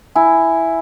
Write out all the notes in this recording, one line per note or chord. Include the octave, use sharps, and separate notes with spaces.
E4 G#5